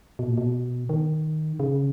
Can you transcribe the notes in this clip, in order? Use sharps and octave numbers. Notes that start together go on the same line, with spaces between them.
B2
A#2
B2
D#3
C#3